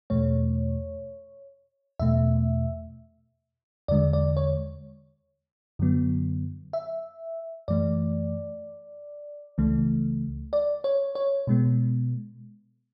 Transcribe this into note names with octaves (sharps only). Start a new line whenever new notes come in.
E2 B2 A3 C#5
E2 B2 A3 E5
E2 D3 G#3 D5
D5
C#5
F#2 D3 F#3 B3
E5
F#2 E3 A3 D5
C#2 C#3 E3 A3
D5
C#5
C#5
B2 G#3 B3